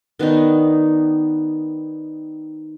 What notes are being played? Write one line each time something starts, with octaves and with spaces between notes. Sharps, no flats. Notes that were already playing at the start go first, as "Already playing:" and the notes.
D#3 B3 D4 D#4